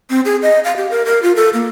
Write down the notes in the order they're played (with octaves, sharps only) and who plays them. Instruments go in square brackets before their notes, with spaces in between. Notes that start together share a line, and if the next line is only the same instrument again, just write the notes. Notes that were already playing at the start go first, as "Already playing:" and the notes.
[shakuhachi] C4
G#4
D#5
F5
G4
A#4
A#4
F4
A4
A#3